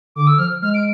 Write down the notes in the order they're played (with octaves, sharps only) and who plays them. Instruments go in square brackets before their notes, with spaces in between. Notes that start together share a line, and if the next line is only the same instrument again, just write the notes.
[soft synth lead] D3 [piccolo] D6
[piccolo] E6
[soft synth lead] F3 [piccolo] F6
[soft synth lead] G#3 [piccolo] F6
[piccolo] D7